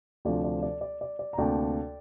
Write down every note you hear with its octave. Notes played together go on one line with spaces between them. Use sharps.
D2 C3 F3 C4 D5
D5
D5
D5
D5
D5
A#5
D2 C3 A#3 D4 D5 G5